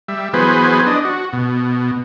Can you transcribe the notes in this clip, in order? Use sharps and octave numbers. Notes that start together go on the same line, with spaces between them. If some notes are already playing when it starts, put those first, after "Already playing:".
G3 E5
E3 F#3 B3 G#4 B4 C5
D4 D#5
F#4
B2